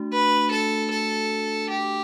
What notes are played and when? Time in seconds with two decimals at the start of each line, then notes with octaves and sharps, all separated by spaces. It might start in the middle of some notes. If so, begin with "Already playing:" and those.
Already playing: A3 D4 F#4
0.12 B4
0.51 A4
0.91 A4
1.69 G4